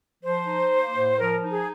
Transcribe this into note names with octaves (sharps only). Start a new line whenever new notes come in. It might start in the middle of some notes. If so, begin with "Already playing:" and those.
F3 C5
D#4
A#3
A2
F3 A#4
D#4
G#4